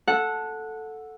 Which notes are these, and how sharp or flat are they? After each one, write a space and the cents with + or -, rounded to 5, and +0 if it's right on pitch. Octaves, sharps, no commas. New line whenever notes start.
A4 +0 F#5 -15